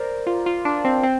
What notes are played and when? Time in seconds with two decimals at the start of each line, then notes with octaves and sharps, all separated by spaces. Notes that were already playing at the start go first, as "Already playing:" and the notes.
Already playing: A#4 C5 D5
0.27 F4
0.46 F4
0.65 D4
0.85 C4
1.03 C4